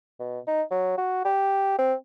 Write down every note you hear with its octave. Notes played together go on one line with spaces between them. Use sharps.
B2
D#4
F#3
F#4
G4
C4